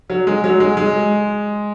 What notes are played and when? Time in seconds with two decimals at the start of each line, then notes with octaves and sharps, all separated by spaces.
0.10 F#3
0.27 G#3
0.44 F#3
0.60 G#3
0.77 G#3